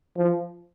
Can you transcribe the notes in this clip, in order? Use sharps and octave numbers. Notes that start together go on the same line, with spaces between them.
F3